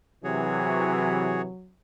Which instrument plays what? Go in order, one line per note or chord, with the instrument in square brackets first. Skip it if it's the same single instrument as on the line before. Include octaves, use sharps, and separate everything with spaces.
[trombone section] C3 E3 [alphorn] F#3 [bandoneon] F#4 G#4 C#5